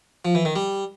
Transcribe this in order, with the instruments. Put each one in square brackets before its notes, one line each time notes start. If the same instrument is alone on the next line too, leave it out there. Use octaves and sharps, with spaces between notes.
[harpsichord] F3
E3
D#3
G3